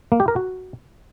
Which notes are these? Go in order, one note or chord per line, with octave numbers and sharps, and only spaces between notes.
A#3
G4
A#4
F#4